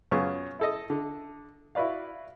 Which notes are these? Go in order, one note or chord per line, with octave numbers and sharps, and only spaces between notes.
F#2 B3 C#4 F4 G#4 C#6
E4 A4 D#5
D3
E4 F#4 B4 D5 F5